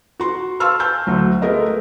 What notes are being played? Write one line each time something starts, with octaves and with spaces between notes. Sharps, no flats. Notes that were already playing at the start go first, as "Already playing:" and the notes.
F#4 C6 C#6
F5 A5 C6 C#6 E6 F6
G#5 A5 E6 G6
D2 F#3
G#3 A3 B3 A#4 D#5